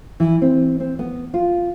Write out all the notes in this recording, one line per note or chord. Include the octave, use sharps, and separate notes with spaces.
E3
C4
C4
B3
F4